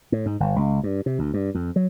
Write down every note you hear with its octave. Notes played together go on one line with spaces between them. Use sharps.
A2
G#2
G1
C#2
G2
C3
D2
G2
F2
F#3